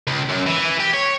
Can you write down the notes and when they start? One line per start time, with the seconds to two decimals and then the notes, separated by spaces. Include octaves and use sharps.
0.07 C#2
0.29 F#2
0.47 E3
0.80 G4
0.94 C#5